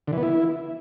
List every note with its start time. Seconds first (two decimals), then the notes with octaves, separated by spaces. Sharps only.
0.07 D3
0.13 E3
0.18 B3
0.23 E4